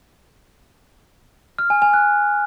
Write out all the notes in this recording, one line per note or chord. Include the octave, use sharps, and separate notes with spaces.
F6
G#5
G#5
F#6